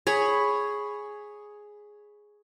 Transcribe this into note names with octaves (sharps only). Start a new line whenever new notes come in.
G#4 C#5 B5